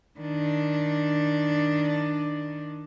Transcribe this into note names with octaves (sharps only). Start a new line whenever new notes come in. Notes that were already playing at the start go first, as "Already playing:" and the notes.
D#3 D4